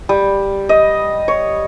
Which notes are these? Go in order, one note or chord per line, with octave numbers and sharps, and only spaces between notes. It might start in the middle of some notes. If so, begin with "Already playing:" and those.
G3
D#5
C#5